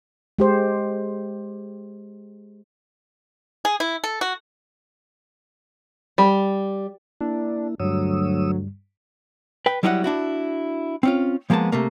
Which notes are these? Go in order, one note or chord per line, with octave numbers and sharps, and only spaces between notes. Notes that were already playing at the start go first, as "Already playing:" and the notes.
G#3 G4 C5
G#4
E4
A4
F#4
G3
A#3 D4 E4
D2 G2 F#3 G3 C#5 D#6 E6
B4 G5
F#3 G3 E4 D#5 E5 F#5
D4 E4 F#4
C4 C#4 F4
F3 G#3 A#3 B3 A5
C3 A3 A#3